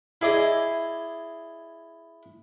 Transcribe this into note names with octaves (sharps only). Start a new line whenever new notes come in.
E4 G#4 D5 D#5